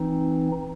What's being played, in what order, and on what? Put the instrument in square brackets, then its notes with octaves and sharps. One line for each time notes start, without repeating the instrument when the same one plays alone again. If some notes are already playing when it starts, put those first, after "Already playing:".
Already playing: [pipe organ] E3 C4 D#4